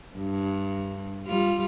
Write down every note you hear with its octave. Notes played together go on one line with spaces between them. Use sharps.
G2
G3 F4